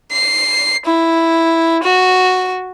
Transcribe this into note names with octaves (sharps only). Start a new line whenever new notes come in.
C7
E4
F#4